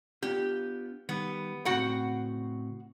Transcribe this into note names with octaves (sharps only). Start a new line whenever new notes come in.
B3 D4 F4 G4
D#3 G3 B3
A2 C#3 C4 F#4 F#5 G5